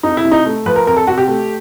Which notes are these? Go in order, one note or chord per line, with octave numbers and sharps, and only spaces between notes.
F2 D#4
E4
C3
D#4
A3
F3 B4
A#4
F2 A#4
A4
C3 F#4
G4
A3